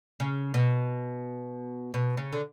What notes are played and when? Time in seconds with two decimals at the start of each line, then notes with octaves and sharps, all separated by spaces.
0.20 C#3
0.54 B2
1.94 B2
2.17 C#3
2.32 D3